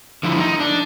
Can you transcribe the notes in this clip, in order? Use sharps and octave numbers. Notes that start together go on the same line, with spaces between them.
D3 F3 E4
D#4
D4